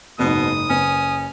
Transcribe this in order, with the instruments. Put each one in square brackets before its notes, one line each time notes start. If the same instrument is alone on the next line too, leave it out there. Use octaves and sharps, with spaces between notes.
[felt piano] F#1 G#2 [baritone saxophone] B2 [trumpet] D#6
[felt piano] F#1 B4 [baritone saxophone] C#4